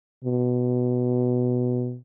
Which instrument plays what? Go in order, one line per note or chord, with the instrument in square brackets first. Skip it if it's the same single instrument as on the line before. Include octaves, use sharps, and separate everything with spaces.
[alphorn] B2